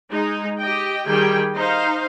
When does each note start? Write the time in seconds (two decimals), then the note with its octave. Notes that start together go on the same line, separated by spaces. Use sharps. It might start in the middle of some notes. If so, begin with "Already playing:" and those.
0.11 G#3 D#4
0.59 G4 D#5 G5
1.05 D#3 G3 G4 G#4 G5 G#5
1.55 D#4 C5 F5